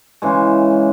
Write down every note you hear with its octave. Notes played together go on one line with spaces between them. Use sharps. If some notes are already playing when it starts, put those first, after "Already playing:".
C#3 E3 G#3